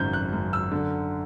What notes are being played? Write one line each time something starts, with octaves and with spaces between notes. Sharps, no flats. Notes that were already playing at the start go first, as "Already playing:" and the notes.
Already playing: G#1 F#2 C#3 G6
F#6
F#2
E6
D3